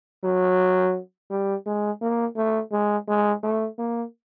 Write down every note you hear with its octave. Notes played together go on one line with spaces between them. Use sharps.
F#3
G3
G#3
A#3
A3
G#3
G#3
A3
A#3